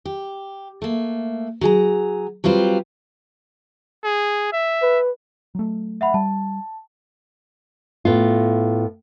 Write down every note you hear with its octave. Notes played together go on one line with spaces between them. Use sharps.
G4
A3 A#3
F#3 G#4 A#5
F#3 G3 C4 F4 B4 C5
G#4
E5
B4
F#3 A3
E5 F#5 B5
G3 A5
A2 B3 F4